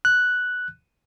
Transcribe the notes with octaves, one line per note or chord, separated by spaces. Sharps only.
F#6